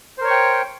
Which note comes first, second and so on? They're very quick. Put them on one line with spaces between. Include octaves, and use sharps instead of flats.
C5 A#4 C#5 C#6 G5